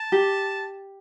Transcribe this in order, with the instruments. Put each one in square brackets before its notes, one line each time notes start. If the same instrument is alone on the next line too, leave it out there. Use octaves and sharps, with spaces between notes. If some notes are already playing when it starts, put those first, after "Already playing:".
Already playing: [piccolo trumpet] A5
[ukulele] G4